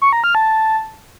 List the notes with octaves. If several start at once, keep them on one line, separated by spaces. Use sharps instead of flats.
C#6
A#5
F6
A5